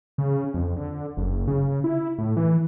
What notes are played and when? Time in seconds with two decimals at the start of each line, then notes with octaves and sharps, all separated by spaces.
0.18 C#3
0.54 F2
0.76 D3
1.17 F#1
1.48 C#3
1.84 E4
2.18 A2
2.37 E3